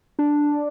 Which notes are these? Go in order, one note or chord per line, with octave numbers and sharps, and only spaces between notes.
D4